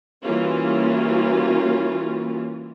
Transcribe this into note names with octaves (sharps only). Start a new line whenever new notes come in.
E3 G3 A#3 C#4 F4 F#4